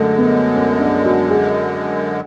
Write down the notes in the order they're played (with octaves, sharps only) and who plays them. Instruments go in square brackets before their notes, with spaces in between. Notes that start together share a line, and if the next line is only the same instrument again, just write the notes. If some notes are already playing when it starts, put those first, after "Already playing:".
Already playing: [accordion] F#2 D3 G#3 [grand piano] A3
[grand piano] B3
C#4
D4
F#4
G#4